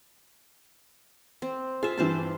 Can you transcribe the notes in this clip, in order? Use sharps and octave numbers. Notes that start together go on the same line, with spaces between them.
C4
F4 G#4 E5
G2 E3 C4 C5 A5